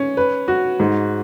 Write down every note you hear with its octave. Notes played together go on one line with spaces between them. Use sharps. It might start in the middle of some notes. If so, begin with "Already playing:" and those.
Already playing: C#4
B4
F#4
G#2